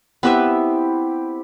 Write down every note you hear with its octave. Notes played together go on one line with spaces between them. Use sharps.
B3 C4 E4 G4 B4 E5